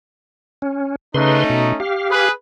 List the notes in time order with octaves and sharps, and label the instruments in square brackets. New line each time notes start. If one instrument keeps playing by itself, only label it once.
[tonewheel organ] C#4
[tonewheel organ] C#3 B4 C6 [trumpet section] A3 C#4 D#4
[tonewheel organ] B2
G4 F5
[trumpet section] G#4 B4